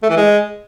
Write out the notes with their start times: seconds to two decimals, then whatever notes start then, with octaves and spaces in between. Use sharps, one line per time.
0.03 A3
0.10 E3
0.17 G#3